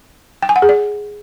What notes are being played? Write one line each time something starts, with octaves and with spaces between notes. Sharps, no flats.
G5
G#5
F#5
G#4
D5